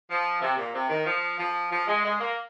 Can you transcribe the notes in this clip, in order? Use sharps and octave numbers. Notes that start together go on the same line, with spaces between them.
F3
C3
A#2
C3
D#3
F3
F3
F3
G#3
G#3
A#3